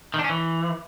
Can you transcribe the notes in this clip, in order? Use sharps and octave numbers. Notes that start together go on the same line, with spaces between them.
D#3
D4
C#4
E3